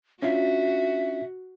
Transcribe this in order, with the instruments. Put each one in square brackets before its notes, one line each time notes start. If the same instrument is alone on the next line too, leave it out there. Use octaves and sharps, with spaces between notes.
[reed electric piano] C#4 D4 F4 [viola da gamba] F#4 [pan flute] E5